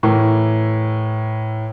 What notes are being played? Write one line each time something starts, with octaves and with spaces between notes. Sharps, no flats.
A2 E3 A#4